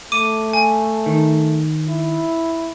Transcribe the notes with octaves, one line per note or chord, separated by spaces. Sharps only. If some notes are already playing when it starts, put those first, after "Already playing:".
A3 D6 D#7
G#5
D#3
E4